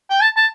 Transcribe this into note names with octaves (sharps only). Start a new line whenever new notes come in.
G5
A5
A5